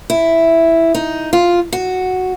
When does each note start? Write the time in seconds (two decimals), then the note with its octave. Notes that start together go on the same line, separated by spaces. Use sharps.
0.10 E4
0.95 D#4
1.33 F4
1.72 F#4